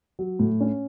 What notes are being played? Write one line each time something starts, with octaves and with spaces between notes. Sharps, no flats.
F#3
A2
C#4